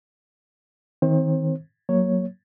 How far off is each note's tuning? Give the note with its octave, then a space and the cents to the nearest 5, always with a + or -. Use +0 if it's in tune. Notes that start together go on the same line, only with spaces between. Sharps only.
D#3 +30 C4 -15 C5 +35
F#3 +0 A#3 +0 C#5 +0